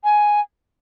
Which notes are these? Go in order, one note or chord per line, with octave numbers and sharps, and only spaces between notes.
G#5